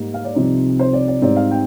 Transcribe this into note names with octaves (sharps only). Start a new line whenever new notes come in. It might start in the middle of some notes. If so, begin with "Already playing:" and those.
Already playing: G#2 G3 A#3
F5
D5
C2 C3 F3 C4 D#4 D5
C5
D5
D5
G#2 G3 C4 D#4 D5
F5
G5